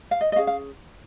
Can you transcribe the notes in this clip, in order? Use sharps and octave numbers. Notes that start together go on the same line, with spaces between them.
F5
D#5
D#5
C#4 G#4 F5
F5